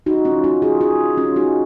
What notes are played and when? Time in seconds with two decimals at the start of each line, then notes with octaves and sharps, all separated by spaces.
0.06 D#4 F#4
0.25 C#4 F4
0.44 D#4 F#4
0.62 F4 G#4
0.81 F4 G#4
1.17 C#4 F4
1.36 D#4 F#4